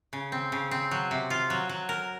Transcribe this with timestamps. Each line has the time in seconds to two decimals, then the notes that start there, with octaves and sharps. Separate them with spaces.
0.13 C#3
0.32 C4
0.52 C#3
0.71 C4
0.91 F#3
1.11 C3
1.30 F4
1.50 F#3
1.69 F#3
1.89 A#4